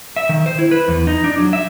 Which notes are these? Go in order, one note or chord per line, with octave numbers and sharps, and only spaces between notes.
E5
D#3
C5
E4
B4
E2
D#4
D4
F#3
E5